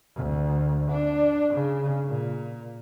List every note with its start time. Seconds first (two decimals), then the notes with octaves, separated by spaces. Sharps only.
0.16 D2
0.92 D4
1.54 C#3
2.07 A#2